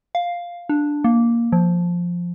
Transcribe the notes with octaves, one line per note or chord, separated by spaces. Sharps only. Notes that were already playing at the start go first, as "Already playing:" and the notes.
F5
D4
A#3
F3